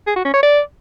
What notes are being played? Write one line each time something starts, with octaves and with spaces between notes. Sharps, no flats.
G#4
F#4
C#4
C#5
D5